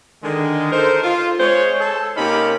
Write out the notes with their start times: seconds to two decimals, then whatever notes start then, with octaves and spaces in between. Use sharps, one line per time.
0.23 D3 D#3 G#3
0.72 D#4 A4 A#4 C5
1.03 F4
1.40 G#3 C5 C#5
1.81 A4
2.17 C3 A#3 C#4 D#4 G4 B5